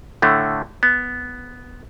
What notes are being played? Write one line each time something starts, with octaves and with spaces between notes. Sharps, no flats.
A2 D3 A3
B3